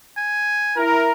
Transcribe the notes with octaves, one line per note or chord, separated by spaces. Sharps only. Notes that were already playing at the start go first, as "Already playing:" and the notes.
G#5
E4 A#4